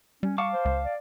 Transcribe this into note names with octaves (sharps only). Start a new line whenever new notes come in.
G3 C#4
F5 A5 C#6 D6
C5
C#2
D5